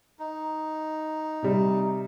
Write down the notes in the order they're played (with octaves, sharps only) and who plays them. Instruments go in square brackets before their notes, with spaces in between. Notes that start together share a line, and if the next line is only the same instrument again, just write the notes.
[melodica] D#4
[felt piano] C3 G3